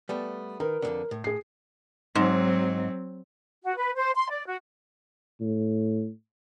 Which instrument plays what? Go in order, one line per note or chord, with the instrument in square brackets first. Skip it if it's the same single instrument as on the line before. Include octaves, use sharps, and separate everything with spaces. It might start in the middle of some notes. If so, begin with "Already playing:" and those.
[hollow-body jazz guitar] G3 A3 B3
[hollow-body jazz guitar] D#3 [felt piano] A#4 B4
[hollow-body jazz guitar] F2 G#2 D3
A2
[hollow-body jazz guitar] A2 [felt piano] G#4 C7
[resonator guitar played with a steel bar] G#2 [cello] F#3 C4
[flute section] F#4
B4
C5
C6
D5
F#4
[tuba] A2